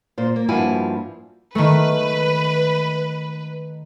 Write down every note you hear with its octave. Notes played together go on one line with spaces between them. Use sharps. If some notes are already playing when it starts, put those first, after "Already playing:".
A#2 C5
A#3
G2 F3 A#3 E4 F#4 G#5
D#3 A3 B4